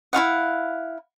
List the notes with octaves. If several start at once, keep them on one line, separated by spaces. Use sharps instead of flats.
E4 F4 F5 F#5